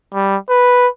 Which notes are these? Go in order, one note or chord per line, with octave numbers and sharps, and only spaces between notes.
G3
B4